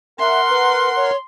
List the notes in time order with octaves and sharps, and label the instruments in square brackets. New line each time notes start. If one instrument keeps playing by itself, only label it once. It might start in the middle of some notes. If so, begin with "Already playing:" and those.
[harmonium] A#4 F#5 [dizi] E5 [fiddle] C6
[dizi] B4
C#5